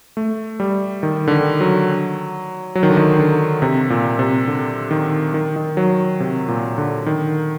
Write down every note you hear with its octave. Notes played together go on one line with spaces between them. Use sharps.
A3
G3
D#3
D3
D#3
F#3
F#3
D#3
D3
D#3
D3
C3
A#2
C3
D3
D#3
D#3
D#3
F#3
C3
A#2
D3
D#3